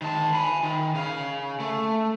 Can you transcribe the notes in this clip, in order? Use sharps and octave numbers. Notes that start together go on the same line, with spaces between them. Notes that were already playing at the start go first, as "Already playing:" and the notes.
D#3 A5
G#5 B5
D#3
C#3 F5
A3